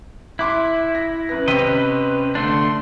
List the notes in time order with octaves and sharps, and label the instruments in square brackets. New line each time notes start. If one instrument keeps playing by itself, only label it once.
[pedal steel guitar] E4 [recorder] E5 [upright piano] C6 D6 F#6
[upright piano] A#6
[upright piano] F#2 A#6 [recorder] B4
[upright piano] C3 C4 B6 [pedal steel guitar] C#4 D#5
[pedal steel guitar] D3 A3 D4 [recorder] C6